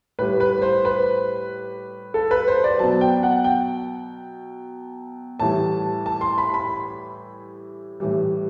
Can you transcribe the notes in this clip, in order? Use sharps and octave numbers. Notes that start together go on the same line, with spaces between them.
A2 G3 B4
B4
C5
B4
A4
B4
C5
D5
B2 F#3 A5
G5
F#5
G5
A2 E3 G3 A5
A5
C6
B5
B5
A2 E3 G3